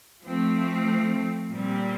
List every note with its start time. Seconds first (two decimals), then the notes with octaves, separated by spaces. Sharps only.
0.24 F3 A3 C4
1.50 A#2 G3 C4